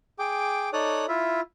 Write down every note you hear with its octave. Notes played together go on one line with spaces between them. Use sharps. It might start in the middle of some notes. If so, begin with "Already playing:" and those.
G#4 G5 D6
D#4 A4 C#5 D5 D#6 F#6
E4 F4 E5